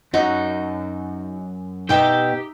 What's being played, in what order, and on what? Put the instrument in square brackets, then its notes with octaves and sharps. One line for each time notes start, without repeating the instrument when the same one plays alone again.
[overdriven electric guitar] F#2 [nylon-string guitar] D#4 [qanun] F#4
[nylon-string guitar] B2 G5 [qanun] D#4 E5 [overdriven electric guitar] G4